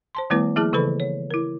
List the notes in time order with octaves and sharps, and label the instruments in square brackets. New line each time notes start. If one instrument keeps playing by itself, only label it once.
[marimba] C5 A5 C6
D#3 G3 A3 B3 E4 B4
F3 A#3 E4 G#4 A5 F6
C#3 E3 A4 B4 B5
C#5
E4 A#4